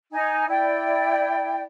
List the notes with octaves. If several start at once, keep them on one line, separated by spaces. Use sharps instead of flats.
D#4 G#5
E4 D5 G5